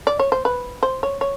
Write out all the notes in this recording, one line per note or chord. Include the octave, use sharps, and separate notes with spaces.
D5
C#5
C5
B4
C5
C#5
C#5